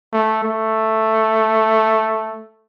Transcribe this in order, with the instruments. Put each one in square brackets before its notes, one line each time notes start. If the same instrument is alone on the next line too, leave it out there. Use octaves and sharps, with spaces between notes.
[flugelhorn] A3
A3